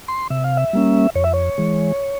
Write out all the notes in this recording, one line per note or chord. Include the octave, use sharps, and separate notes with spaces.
C6
C3 E5
F5
E5
G3 A#3 C#4
F2 C#5
E5
C#5
E3 G#3